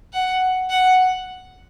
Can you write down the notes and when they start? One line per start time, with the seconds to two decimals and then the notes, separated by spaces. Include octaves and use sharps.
0.13 F#5
0.70 F#5